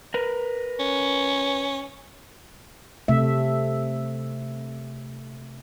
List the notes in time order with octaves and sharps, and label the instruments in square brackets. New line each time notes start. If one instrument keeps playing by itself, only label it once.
[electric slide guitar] A#4 B4
[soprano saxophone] C#4
[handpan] C3 A3 E5